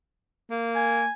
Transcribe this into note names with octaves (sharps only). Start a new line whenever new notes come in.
A#3
G#5